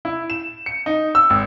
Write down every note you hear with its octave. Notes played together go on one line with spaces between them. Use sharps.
E4
E7
C#7
D#4
E6
G#1